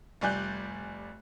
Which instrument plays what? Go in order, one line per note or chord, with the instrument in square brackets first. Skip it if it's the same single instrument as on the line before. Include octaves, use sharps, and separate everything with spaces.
[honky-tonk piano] F1 G3 D5 G#5 F#6 G6